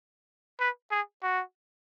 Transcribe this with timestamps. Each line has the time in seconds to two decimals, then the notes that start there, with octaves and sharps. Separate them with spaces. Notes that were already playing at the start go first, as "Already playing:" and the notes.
0.60 B4
0.91 G#4
1.23 F#4